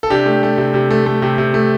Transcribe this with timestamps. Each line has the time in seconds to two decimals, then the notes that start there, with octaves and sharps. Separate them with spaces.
0.03 A4
0.10 C3 D4 G4
0.26 A3
0.43 A3
0.58 C3
0.74 C3
0.90 A3
1.06 A3
1.22 C3
1.38 C3
1.54 A3